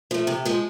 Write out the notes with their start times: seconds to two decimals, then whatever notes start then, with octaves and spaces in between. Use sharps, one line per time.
0.11 F3 A3
0.27 C3
0.45 F3 G#3